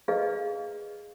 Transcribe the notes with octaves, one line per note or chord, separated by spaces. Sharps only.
G#4 B4 D5 D#5 F5